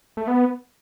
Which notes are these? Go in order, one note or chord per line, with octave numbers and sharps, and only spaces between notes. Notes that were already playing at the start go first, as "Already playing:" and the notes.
A3
B3